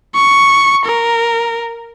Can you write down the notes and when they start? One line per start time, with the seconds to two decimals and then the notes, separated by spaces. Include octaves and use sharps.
0.15 C#6
0.85 A#4